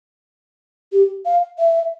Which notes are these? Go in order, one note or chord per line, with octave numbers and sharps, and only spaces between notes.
G4
F5
E5